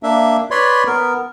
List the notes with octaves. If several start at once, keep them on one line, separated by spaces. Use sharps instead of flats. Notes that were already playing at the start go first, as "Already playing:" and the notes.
A#3 D4 E5
B4 C#5 D5 B5 C6
B3 A#4